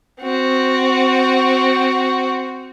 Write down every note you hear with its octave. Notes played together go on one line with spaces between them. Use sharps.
C4 F#4